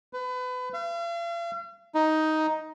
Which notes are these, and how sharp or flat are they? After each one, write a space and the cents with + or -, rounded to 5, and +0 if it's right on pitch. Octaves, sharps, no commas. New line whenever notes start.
B4 +30
F5 -45
D#4 +10